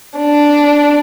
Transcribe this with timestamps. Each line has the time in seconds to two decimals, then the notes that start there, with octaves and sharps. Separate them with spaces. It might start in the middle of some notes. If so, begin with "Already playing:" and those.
0.17 D4